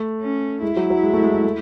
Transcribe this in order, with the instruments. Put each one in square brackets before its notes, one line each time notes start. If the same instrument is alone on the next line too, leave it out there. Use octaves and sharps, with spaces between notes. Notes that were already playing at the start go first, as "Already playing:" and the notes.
Already playing: [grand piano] A3
[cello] C#4
[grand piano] G#3 [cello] E4
[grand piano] F#3
F#3
G#3
A3
G#3
G#3
A3